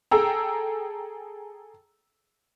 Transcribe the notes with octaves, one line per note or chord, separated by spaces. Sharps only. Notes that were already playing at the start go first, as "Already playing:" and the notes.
G#4 A4 G5 A#5 E6